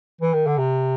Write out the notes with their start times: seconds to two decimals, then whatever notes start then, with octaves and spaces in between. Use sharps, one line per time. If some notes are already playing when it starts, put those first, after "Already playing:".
0.21 E3
0.33 D#3
0.46 D3
0.58 C3